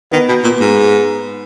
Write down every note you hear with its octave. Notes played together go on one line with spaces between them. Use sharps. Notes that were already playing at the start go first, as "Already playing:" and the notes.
D#3 B3
B2
A#2
G#2